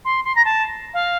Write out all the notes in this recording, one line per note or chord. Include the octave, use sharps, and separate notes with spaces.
C6
C6
A#5
A5
F5